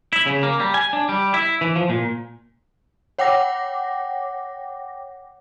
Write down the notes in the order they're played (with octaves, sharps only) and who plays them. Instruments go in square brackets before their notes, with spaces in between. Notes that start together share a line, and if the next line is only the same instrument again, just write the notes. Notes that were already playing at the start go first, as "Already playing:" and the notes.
[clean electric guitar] E4
C#3
A#3
G3
G#5
D4
G3
E4
E3
F3
A#2
[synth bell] C#5 F#5 G5 D6 A#6